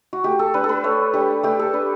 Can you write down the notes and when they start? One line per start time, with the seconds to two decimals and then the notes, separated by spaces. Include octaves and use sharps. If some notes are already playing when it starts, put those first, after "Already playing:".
0.13 F#4
0.24 A3 G4
0.39 A4
0.54 D4 B4
0.64 A4
0.69 B4
0.84 A3 C#5
1.14 D4 G4
1.43 A3 G4
1.59 A4
1.74 D4 B4